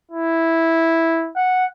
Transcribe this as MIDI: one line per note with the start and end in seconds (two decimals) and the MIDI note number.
0.12 1.30 64
1.36 1.66 78